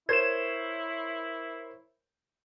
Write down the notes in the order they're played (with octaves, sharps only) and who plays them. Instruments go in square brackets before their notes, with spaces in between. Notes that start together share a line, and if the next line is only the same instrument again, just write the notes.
[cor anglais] E4 [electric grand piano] A#4 C5 C#5 [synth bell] G#6 E7